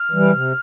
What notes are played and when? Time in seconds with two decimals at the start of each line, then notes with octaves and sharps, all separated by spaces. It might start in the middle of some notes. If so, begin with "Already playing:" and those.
Already playing: F6
0.11 E3 G3
0.32 C3